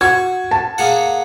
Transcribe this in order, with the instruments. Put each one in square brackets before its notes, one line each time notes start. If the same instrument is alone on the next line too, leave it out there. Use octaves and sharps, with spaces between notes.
[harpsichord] F#4 [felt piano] G#6
[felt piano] A5
[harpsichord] A#3 G#4 F#5